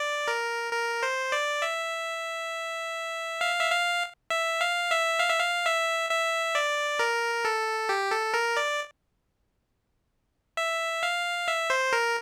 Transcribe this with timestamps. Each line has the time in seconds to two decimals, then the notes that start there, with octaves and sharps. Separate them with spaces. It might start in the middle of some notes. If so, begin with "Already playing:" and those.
Already playing: D5
0.28 A#4
0.72 A#4
1.03 C5
1.32 D5
1.62 E5
3.41 F5
3.60 E5
3.71 F5
4.30 E5
4.61 F5
4.90 E5
5.20 F5
5.30 E5
5.39 F5
5.65 E5
6.10 E5
6.55 D5
6.99 A#4
7.45 A4
7.89 G4
8.11 A4
8.34 A#4
8.57 D5
10.57 E5
11.03 F5
11.48 E5
11.70 C5
11.93 A#4